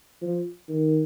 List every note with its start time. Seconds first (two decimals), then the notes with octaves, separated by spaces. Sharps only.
0.21 F3
0.69 D#3